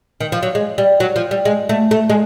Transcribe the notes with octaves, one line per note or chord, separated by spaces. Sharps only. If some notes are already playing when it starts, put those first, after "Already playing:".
D#3
F3
F#3
G#3
G3
F#3
F3
G3
G#3
A3
A3
G#3